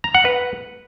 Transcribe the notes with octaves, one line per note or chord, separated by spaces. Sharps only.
A#5
F#5
B4